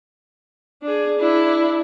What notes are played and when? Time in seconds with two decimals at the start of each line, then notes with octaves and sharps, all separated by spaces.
0.83 D4 G#4
1.19 D4 E4